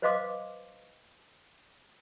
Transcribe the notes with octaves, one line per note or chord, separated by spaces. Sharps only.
B4 C5 D#5 F5 C6 D6